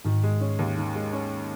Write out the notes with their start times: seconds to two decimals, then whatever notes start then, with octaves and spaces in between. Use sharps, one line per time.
0.05 G#2 D#3
0.24 G#3
0.41 C#4
0.59 D#2
0.78 D#3
0.95 G#3
1.13 C#4